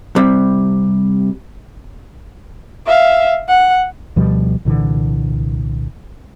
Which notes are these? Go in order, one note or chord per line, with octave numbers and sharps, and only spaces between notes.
C3 G3
E5 F5
F#5
D2 B2 F3 G3
C2 A#2 D3 E3